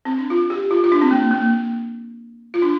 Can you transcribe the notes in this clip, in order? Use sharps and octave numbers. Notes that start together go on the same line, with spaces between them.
C4
D4
F4
G4
F4
F4
D4
C4
A#3
A#3
F4
D4